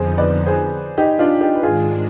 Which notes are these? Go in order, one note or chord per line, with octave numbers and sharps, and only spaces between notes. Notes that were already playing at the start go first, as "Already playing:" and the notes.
Already playing: F2 D3 F3 B3 D#4 G#4 C5
B4 D5
G#4 C5
D#4 G4
D4 F4
D#4 G4
B4
G#2 D#3 G#3 D4 F4 G#4